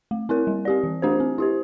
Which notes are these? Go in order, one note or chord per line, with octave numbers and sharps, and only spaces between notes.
A3
C4 E4 A#4
G3
C4 G4 D5
E3
A3 D4 G4 C5
C4
E4 G4 C5